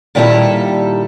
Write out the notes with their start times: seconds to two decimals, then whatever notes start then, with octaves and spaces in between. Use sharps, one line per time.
0.15 A#2 D#3 G3 E4 G4 A4